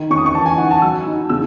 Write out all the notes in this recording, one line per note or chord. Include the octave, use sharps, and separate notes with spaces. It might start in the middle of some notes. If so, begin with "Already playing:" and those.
Already playing: D#3
C#4 C#6
D#6
C#6
E3 A5
G#5
D#4 F#5
A5
F#3 E6
D#4
C#3 E6